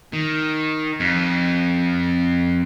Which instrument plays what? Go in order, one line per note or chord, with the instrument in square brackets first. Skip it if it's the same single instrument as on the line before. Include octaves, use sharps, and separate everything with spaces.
[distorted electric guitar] D#3
F2